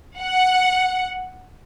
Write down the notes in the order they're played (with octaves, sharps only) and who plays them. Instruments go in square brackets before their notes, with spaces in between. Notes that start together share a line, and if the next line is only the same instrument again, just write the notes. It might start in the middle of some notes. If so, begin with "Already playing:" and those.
[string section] F#5